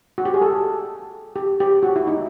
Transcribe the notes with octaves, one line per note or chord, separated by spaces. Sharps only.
F#4
G4
G#4
A4
G4
G4
F#4
E4
D#4